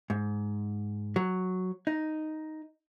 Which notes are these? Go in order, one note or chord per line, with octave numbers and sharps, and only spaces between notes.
G#2
F#3
D#4